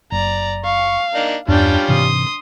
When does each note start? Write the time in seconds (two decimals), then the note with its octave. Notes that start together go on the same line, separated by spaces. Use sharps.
0.12 F#1 D5 A#5
0.65 F5 C#6
1.15 A#3 D4 D#4
1.48 E2 G2 G3 C#4 D4 F4 G5
1.88 G#2 C3 E3 C6 D#6